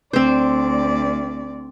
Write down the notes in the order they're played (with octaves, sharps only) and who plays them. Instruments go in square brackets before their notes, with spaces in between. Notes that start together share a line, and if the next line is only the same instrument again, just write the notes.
[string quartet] D2 D5 [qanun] C4 C5